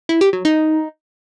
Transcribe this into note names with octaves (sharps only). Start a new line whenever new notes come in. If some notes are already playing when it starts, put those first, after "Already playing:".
E4
G4
F#3
D#4